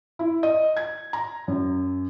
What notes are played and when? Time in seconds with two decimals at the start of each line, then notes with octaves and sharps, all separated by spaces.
0.19 E4
0.43 D#5
0.77 G#6
1.13 A#5
1.48 F#2